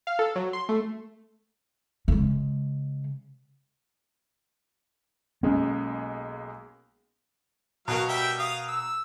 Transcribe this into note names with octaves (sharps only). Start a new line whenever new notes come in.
F5
A4
F#3
C6
A3
C#3 G#3
B1 G#3 A#3 C4 C#4
B2 F#3 F#4 A#4 F5
G3 E5 G5
F5 D#6
E6